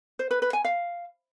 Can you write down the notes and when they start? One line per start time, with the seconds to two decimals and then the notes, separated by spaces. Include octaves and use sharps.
0.19 C5
0.31 B4
0.42 B4
0.53 G#5
0.65 F5